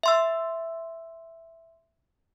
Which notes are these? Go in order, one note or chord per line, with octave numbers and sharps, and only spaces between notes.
E5 C6 E6